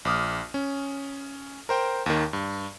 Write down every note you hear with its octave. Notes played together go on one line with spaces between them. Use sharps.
A#1 D6 D#6 F6
C#4
A#4 C5 G5
D#2 D#3
G2